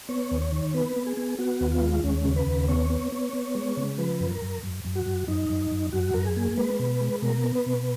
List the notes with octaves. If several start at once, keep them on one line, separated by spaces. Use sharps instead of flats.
B3 C#5
D#2
C#5
D#3
B3 B4
B3
G#4
B3
B3 F#4
D#2
F4
G#3
D#2 C#4
C#3
B4
D#2
B3 C#5
B3
B3
B3
G#3
C#3
F3 B4
F#2
A#4
F#2
F#2
F#2
F#4
F#2
F#2 D#4
F#2
F#2
F#2 F#4
F#2 A#4
G#4
A#3
G#3 B4
B2
G#3
B2 A#4
B3
B4
B2